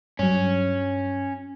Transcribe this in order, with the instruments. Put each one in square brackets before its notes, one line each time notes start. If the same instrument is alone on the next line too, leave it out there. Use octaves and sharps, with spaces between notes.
[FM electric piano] G2 F#3 [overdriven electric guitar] C#4